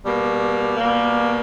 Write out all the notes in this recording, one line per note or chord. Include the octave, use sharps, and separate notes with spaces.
B2 G3 A#3
B2 G3 A#3